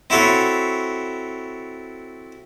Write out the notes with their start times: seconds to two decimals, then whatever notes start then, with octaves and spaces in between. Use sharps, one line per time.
0.10 C4 E4 F#4 A4 C#5